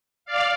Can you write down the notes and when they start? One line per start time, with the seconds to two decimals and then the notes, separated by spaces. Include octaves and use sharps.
0.25 D5 F5